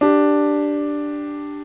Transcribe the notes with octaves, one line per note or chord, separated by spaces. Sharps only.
D4 G4